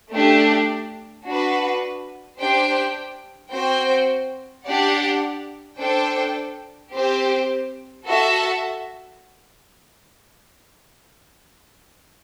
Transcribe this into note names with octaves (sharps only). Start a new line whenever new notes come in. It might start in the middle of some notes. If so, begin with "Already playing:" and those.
A3 D4 G4
D4 F#4 B4
D4 G4 C5 G5
C4 F#4 C5 G5
D4 G4 D5 F#5
D4 A4 C5 G5
C4 G4 C5
F#4 A4 E5 A5